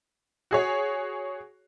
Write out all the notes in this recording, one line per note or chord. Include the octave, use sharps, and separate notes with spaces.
F#4 G#4 C#5